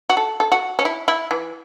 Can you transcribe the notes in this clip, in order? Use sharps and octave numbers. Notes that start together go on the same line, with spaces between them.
F#4
A4
A4
F#4
C#4
E4
E4
E3